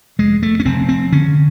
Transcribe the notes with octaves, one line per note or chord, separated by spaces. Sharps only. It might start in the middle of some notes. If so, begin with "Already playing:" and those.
F1 G#3
A3
C#4
F1 C4
C4
D3 C#4